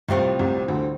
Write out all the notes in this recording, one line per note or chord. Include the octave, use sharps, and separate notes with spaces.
C2 A2 C3 G3 C4 F4 C5
C2 C3
D2 D3